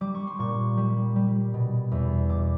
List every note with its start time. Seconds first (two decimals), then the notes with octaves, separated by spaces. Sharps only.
0.01 G3 D6
0.15 C#6
0.27 C6
0.39 A#2 C#6
0.77 G3
1.16 G3
1.54 B2
1.91 E2
2.29 B2 D6